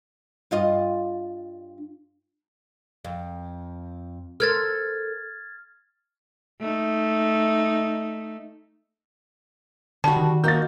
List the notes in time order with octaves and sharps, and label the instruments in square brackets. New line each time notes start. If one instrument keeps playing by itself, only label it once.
[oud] G2 F4 D#5
F2
[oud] A4 A#4 C5 [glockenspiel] F6 G#6 A6
[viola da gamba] A3 D#4
[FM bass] D3 [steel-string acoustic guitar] G3 F#4 [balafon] A5
[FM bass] D#3
[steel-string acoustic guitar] A#3 D#4 F#4 [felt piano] G6 A6